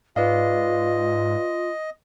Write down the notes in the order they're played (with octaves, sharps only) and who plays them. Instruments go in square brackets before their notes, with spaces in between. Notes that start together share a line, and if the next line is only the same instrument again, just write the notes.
[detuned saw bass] G#2 [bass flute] F4 [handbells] B4 D5 F5 [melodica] D#5